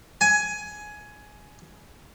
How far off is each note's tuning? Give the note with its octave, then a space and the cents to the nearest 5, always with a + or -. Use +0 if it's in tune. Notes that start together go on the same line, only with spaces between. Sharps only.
G#5 +15